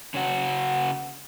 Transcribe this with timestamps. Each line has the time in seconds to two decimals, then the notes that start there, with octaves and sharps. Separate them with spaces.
0.14 C#3 C#4 F#4